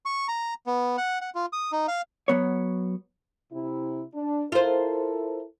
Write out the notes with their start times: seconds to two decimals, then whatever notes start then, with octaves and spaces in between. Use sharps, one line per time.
0.05 C#6
0.28 A#5
0.66 B3
0.97 F#5
1.21 F#5
1.35 F4
1.53 D#6
1.72 D#4
1.88 F5
2.28 F#3 B3 C#5
3.52 C3 E4
4.14 D4
4.52 E4 F4 A4 A#4 C5